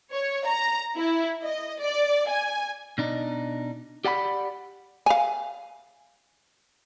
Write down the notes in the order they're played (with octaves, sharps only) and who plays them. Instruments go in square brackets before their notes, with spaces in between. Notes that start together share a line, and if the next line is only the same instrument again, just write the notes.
[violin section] C#5
A#5
E4
D#5
D5
G#5
[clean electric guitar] B2 D4 D#4
G4 D5 F#5 G5 B5
[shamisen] F5 G#5